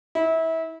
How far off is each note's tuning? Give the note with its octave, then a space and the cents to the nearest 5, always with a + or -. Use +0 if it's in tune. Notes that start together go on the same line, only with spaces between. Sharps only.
E4 -25